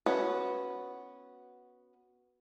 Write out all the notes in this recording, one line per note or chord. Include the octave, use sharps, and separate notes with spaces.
B3 C#4 F#4 B4